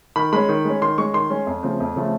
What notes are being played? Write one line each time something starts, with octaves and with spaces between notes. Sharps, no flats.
D#3 B5
G#3 C#4 B5
D#3
G#3 C#4
D#3 C6
G#3 C#4 C#6
D#3 C6
G#3 C#4
F2
C#3 F3 A3 C4
F2
C#3 F3 A3 C4